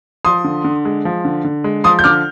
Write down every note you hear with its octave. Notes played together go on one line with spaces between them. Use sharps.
F3 C6 D#6
D3
D3
G#3
F3
D3
D3
G#3
F3 C6 D#6
G6
D3 D6 F6